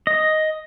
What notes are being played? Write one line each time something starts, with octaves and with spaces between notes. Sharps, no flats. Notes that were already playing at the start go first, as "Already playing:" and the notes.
D#5